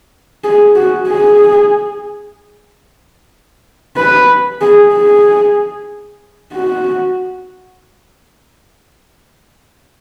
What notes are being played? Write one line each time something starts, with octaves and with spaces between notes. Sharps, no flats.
G#4
F#4
G#4
B4
G#4
G#4
F#4